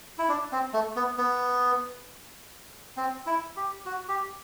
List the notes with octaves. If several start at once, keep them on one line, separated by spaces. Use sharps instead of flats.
E4
D4
C4
A3
B3
B3
C4
E4
G4
F#4
G4